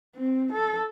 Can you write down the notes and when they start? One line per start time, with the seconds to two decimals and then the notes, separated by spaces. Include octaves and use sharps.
0.16 C4
0.53 A4